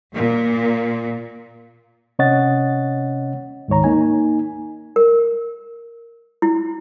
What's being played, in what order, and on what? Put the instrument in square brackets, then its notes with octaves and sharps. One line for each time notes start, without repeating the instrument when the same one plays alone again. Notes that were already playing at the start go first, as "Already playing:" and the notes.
[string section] A#2
[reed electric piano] C3 C#4 C#5 D#5 F#5 A6
D2 G#2 D#3 C#5 A#5
A#3 D#4 G#5
[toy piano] A#4
E4